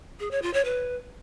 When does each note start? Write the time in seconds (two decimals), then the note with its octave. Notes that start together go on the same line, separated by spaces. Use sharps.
0.20 G#4
0.31 C#5
0.42 F4
0.54 C#5
0.65 B4